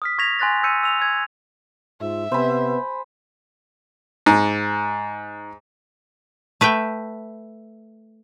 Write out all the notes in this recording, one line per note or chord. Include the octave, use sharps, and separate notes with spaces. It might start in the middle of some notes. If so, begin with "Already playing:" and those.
D#6 F6 B6
C#6 G#6 A#6 B6 F7
G#5 C6 F#6 A6 A#6
E6 G6 C#7 D#7
E6 F7
E6 G#6
G#2 F4 E5
C3 B3 C5 G#5 B5
G#2
A3 B4 E5 G5